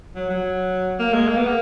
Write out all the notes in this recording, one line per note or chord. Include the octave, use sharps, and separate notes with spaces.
F#3
F#3
A#3
G#3
A#3
B3
A#3